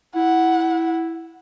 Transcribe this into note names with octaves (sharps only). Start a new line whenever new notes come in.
E4 F#5